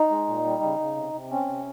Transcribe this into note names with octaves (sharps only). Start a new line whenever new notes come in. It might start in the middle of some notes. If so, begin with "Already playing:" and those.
Already playing: D#4
G#3
A#2
G3
C#3
C#3
C3
C3
C4 C#4
C3